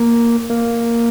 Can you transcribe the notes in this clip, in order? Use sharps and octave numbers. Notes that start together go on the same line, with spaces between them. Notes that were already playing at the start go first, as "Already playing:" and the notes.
Already playing: A#3
A#3